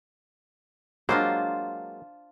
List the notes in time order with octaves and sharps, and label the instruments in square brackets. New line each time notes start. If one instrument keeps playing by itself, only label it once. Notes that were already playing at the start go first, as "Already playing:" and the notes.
[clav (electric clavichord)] F#3 G#3 A#3 [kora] D4 F4 C5